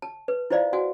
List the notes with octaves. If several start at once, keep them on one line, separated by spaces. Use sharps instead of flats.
A5
B4
E4 F4 C5 D5 D#5 F5
F#4 F#5 G#5